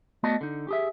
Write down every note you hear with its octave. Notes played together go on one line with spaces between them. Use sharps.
A3 B3 F#4 D5 D#5 A5
D3 D#4
G4 G#4 E5